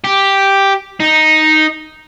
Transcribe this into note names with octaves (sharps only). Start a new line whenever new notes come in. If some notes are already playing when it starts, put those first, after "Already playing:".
G4
D#4